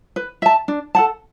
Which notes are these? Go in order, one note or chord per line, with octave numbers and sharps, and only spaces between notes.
B4
E5 A5
D4
A4 F#5 A5